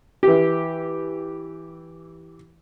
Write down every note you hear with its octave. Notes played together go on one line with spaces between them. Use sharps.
E3 G4